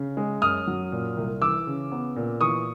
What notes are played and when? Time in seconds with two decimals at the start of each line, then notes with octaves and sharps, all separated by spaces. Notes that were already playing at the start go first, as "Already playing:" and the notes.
Already playing: C#3
0.17 G#3
0.42 F#2 D#6 F6
0.67 F#3
0.92 A#2
1.17 C2
1.42 E3 D6 E6
1.67 C#3
1.92 B3
2.16 A#2
2.41 E3 C#6 D#6